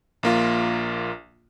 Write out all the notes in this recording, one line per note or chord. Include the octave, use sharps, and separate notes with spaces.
A#1 A#3 F4